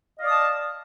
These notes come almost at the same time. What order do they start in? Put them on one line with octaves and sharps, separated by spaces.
D#5 F5 D5 D#6 A5